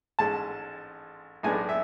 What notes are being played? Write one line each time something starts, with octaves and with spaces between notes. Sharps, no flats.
A1 G#2 G#3 A5
B1 A2 G#3 B3 D4 G#5
E5